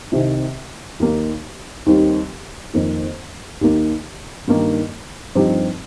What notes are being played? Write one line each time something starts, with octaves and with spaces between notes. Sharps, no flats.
C2 C3 D#3 C4
D#2 D#3 A#3
D#2 D#3 G3 C4
F2 D#3 A#3
D#2 D#3 A#3
G2 D#3 G3 A#3 D#4
G2 F3 C4 D#4 G4